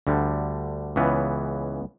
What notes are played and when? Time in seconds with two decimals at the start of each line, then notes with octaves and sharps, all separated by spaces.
0.07 D2 D3 G3
0.96 C#2 C#3 E3 B3